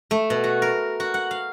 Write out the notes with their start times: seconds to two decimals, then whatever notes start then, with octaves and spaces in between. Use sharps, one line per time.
0.11 A3
0.30 B2
0.44 F#4
0.62 A#4
1.00 F#4
1.14 F#5
1.31 F5